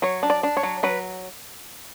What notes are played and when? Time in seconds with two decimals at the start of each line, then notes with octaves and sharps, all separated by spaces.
0.02 F#3 C#5
0.23 D4
0.30 D5
0.43 D4
0.57 C#5
0.63 F#3
0.83 F#3 B4